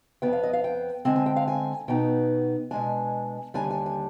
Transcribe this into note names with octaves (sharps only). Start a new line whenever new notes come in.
F2 D#3 B3 G5
F5
D#5
F5
G5
D3 G#3 C4 G#5
G#5
G5
F5
G#5
B2 B3 D#4 G5
B2 G#3 D4 G#5
D#2 D3 G3 D4 G#5
G#5
G#5